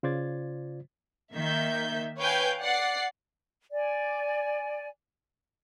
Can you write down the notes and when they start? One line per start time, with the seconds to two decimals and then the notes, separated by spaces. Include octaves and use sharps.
0.03 C#3 F4 C5 D5 G#6 A6
1.33 D#3 A#3 E5 G6
2.20 B4 C#5 F5 G5 G#5 G6
2.62 D5 F#5 C7
3.73 D5 G#5